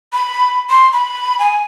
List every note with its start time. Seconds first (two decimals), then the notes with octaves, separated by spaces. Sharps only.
0.13 B5
0.70 C6
0.93 B5
1.39 G#5